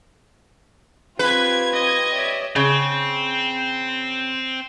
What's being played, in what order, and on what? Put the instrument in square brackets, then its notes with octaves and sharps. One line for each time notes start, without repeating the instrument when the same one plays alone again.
[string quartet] C4 F4 [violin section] G4 G#6 [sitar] B4
[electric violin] D#5
[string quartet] C#5 D5 E5
[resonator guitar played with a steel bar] C#3 [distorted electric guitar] C4